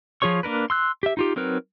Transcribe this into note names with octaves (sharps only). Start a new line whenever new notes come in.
F3 F4 G#4 C#5 C#6
A#3 D4 A#4 B4
C6 E6 F#6
G4 E5
D#4 F4 G4
F#3 C4 D#4 A#4 B4